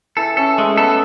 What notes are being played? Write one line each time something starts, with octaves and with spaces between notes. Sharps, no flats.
E3 A4
C#4 A4
G#3 A3
B3 A4